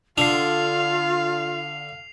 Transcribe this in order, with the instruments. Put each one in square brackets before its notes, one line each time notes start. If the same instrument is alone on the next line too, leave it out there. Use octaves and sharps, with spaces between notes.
[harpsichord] D3 [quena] F4 [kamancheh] F5 [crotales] C7 F7